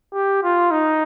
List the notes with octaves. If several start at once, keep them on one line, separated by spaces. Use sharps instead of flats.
G4
F4
D#4